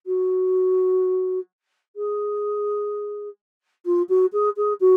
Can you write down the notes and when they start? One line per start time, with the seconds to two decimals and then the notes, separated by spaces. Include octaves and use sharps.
0.06 F#4
1.96 G#4
3.85 F4
4.09 F#4
4.33 G#4
4.56 G#4
4.80 F#4